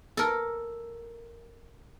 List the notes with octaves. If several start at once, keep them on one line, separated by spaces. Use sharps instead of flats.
A4 A#4